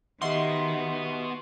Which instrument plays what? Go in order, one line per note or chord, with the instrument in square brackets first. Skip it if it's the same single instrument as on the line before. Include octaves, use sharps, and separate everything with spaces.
[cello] D#3 [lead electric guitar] B3 F#4 [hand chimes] G4 D#5 E5 [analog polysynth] C6